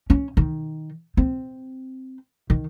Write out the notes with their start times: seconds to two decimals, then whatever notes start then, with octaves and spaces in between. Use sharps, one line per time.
0.10 C#4
0.37 D#3
1.17 C4
2.50 D#3